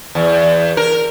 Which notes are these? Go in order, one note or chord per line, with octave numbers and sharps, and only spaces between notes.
E2
A#4